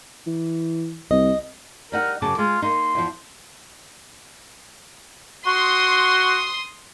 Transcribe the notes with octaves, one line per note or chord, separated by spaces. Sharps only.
E3
C2 D#5
G3 D#4 A#4 F#5
F#2 C#3 A5 D6
G#3 F4
A#3 D#4 C6
E2 F3
F#4 C6 D#6